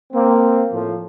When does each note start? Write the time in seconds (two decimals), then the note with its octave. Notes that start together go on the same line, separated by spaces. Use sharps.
0.13 A#3 C4
0.72 A2 F3